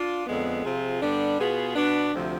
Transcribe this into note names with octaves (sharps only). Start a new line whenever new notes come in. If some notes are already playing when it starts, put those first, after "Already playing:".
Already playing: D4 F4
F2 D3 G#3 B3
C3 F3 C4 F4 G#4
G2 D3 G3 B3 D4
B2 B3 F4 G#4
B2 B3 D4
D2 C3 F3 C4